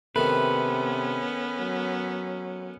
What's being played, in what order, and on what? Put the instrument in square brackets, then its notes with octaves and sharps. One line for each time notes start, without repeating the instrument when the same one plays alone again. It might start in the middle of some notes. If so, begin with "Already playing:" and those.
[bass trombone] C3 [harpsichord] D#3 A3 [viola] B3 C#4 [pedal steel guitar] B4
[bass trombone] F#3